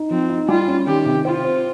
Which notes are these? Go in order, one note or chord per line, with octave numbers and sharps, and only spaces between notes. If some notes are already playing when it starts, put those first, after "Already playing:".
Already playing: D#4
F3 C4
D#4
G3 F4
C#4
D#3 G4
C3
C4 F4
C5